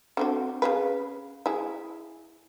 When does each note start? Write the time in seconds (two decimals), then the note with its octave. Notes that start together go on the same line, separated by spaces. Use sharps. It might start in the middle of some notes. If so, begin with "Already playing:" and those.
0.17 D3 C4 F#4
0.62 C#3 G#4 B4
1.46 E4 G#4